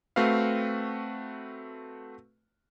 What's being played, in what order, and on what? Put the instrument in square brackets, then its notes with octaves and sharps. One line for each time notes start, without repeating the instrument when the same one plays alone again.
[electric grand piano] A3 C4 F#4 B4 F5